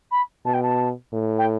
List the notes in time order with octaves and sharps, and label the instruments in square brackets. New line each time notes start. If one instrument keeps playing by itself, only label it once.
[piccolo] B5
[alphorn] B2 [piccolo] A5
[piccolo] G5
A5
[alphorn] A2
[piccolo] G5